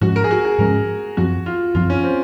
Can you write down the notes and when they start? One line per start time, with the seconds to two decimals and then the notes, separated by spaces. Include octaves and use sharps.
0.01 G#2 F3 G#3 C#4 F#4
0.16 A#4
0.24 G#4
0.31 F#4
0.45 G#4
0.59 G#2 F3 G#3 C#4 A#4
1.17 F#2 F3 C4 F#4
1.46 F4
1.75 F#2 F3 C4 F4
1.90 C#4
2.03 C4